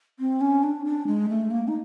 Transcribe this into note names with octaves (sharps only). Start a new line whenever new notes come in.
C4
C#4
D4
D4
G#3
A3
A#3
D#4